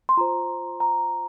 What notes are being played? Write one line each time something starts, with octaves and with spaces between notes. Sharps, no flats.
C6
F4 C5 A#5
A#5